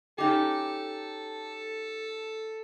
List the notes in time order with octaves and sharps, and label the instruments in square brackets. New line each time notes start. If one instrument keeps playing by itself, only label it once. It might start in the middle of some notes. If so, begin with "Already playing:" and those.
[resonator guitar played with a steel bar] C#4 D#4 G4 [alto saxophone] A4